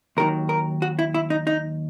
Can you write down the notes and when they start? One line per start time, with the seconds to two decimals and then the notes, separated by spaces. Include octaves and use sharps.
0.17 D#2 D#3 F#3 A#4
0.49 A#4
0.82 F#4
0.99 E4
1.14 E4
1.30 D#4
1.47 D#4